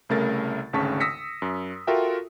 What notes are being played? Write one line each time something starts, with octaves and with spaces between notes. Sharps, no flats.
C2 C#3 A3 A#4 A6
G#1 D2 C#3 A5 C#6 B6
D#6 E6 A#6 B6 C#7
F#2
F4 F#4 A4 A#4 E5 G5